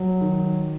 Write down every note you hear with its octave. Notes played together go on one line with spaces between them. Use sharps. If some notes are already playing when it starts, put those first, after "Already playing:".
Already playing: F#3
D#3